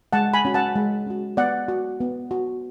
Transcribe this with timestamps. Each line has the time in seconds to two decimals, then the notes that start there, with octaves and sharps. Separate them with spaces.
0.13 G#3 F#5 A5
0.34 G#5 B5
0.45 C#4 F#4
0.54 F#5 A5
0.75 G#3
1.06 C#4 F#4
1.37 B3 D5 F#5
1.68 F#4
2.01 B3
2.31 F#4